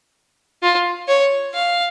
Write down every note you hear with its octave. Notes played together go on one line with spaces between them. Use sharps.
F4
C#5
F5